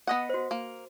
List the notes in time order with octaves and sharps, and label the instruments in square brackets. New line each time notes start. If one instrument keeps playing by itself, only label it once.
[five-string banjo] B3 D#5 F#5
[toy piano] F#4 C5
[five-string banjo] A#3